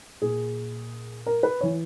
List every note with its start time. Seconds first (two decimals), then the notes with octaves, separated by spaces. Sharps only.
0.22 A#2 G#4
1.26 A#4
1.43 B4
1.61 E3 C#5